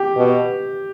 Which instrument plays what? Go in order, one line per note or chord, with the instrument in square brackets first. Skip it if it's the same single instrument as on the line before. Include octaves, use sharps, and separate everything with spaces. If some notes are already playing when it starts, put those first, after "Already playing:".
Already playing: [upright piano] G4
[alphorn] B2